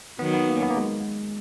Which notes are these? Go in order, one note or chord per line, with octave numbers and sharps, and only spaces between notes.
D#3 F#3 B3
B3
A#3
C#4
B3
A#3
G#3